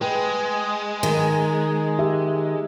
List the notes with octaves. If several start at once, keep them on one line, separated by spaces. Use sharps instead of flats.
G#3 B4 G5
D#3
G4 E5